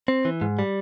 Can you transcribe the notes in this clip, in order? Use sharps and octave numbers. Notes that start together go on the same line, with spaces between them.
C4
E3
G#2
G3